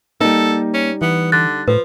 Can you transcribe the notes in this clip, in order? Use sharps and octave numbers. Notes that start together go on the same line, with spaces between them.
G3 A#3 D#4 A4
C#4
E3 B3
D3 F#6 A6
A2 F3 B4